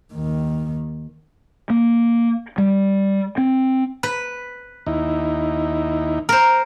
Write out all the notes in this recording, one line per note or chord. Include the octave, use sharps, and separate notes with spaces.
D#2 D#3
A#3
G3
C4
B4
D#2 D#4 E4
A#4 C5